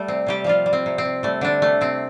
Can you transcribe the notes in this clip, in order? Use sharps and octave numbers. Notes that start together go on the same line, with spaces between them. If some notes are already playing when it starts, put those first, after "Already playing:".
Already playing: G3 A3
C3 C4
C3 G3 G4
F3 G3 F4
G3
C4
C3
C4
C3
G3 A3
D3 G3 D4
C3 A3
C3 C4